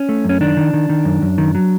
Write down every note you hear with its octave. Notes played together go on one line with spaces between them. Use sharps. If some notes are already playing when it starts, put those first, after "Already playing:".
Already playing: C#4
A3
F#2 C#4
D#3 D4
D#3
D#3
D#3
F#2
F#2
D#3
F#3